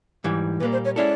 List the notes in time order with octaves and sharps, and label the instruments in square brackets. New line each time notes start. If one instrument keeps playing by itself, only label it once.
[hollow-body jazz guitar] G#2 E3 G3
[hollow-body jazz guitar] A#2 G3 A#3 [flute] B4
[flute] C5
C#5
[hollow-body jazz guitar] G#3 C#4 E4 A4 [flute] D5